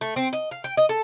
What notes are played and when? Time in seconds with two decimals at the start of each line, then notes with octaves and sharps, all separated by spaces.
0.01 A3
0.16 C4
0.33 D#5
0.51 F5
0.64 G5
0.77 D#5
0.89 A4